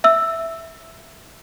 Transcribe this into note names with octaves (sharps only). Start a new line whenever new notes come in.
E5 E6